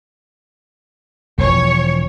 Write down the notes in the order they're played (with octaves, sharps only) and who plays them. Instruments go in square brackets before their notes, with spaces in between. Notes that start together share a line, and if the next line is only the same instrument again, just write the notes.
[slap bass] E1 E3 F3 [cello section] C#5